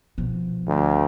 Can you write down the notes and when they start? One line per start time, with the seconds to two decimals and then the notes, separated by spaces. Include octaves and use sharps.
0.18 B2 F3
0.67 D2